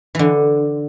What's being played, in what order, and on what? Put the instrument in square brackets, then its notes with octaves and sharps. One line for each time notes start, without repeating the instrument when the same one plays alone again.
[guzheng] D3 E3